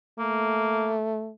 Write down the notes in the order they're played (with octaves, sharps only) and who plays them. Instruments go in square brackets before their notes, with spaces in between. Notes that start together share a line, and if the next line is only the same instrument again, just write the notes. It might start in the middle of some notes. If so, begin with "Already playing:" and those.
[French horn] A3 [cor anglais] A#3